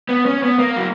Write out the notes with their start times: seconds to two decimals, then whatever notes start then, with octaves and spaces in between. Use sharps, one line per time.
0.09 B3
0.26 C#4
0.43 B3
0.59 A#3
0.76 F#3